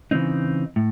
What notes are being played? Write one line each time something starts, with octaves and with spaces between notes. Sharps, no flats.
C#3 E3 G#3 C4 D#4
A2